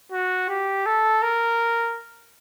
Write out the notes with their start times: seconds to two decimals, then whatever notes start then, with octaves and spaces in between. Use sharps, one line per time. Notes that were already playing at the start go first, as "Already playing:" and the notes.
0.12 F#4
0.49 G4
0.86 A4
1.23 A#4